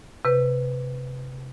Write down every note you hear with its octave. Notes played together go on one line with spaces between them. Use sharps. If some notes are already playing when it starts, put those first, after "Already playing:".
C3 B4